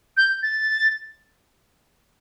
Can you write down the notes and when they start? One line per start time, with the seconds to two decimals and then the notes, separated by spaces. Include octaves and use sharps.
0.17 G6
0.43 A6